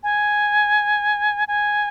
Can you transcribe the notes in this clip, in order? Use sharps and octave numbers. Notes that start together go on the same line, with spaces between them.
G#5
G#5